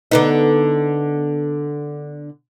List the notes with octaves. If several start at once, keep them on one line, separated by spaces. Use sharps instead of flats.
D3 B3 D#4